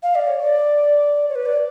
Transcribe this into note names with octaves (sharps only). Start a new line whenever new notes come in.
F5
D5
C#5
D5
C#5
B4
D5